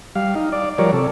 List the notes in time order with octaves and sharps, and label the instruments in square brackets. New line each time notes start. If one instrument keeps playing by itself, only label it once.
[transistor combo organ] G3 F5
D#4
D5
F3 G3 A#4 C#5 D5
C3 A4